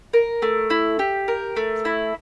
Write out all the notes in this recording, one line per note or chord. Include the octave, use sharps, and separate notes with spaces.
A#4
A3
E4
G4
A#4
A3
E4